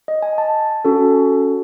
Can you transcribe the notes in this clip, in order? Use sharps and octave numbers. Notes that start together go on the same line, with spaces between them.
D#5
G#5
A5
C#4 F#4 A4